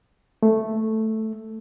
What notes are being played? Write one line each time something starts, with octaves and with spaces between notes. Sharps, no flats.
A3